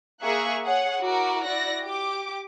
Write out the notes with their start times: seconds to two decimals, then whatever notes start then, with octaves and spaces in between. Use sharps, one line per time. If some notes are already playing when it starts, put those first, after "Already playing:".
0.22 A#3 G#4 A#4 E5 C#6 F#6
0.64 G#4 C#5 F#5
1.01 E4 F#4 A#4 D6
1.44 E4 F#4 D5 F#6 A#6
1.82 G4 D6